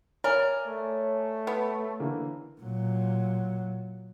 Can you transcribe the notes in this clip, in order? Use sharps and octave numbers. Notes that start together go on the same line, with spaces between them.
A#4 C#5 D5 G#5
A3
B3
D3 E3 A#3
A#2 F#3